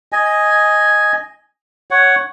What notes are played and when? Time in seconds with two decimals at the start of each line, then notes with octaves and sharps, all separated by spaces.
0.12 D#5 G#5
1.91 C#5 F#5